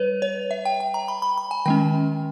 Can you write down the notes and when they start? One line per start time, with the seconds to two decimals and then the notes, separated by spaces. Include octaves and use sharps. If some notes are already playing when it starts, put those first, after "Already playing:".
Already playing: G3 B4 C#5
0.22 C#5
0.51 E5
0.65 G5
0.80 G5
0.94 A#5
1.08 B5
1.22 B5
1.38 B5
1.51 G#5
1.66 D#3 G#3 C#4 G5